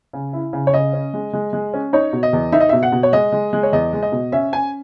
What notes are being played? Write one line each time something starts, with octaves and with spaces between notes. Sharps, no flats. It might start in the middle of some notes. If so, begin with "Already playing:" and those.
C#3
E4
C#3
C#5
C#3 D#5
C#4
G#3
G#3
G#3
C#4
D#4 C#5
B2
D#5
E2
D#4 E5
D#5
B2 E5
F#5
B2
C#5
G#3 D#5
G#3
G#3
C#5
E2 D#5
G#3
D#5
B2
C#4 E5
C#4 G#5